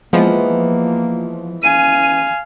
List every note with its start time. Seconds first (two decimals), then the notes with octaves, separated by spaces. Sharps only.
0.13 E3 F3 G#3 A#3 B3
1.63 C#4 F5 G#5 D#7